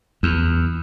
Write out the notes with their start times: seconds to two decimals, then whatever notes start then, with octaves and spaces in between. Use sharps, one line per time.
0.23 E2